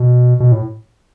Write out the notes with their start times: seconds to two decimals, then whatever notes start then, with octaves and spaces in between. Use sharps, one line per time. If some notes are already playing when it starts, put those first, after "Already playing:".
Already playing: B2
0.40 B2
0.52 A2